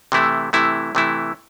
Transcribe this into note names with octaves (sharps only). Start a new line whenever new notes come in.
C3 E3 A3 E4
C3 E3 A3 E4
C3 E3 A3 E4